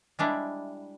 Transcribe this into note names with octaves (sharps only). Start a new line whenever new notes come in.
G3 G#3 D4 E4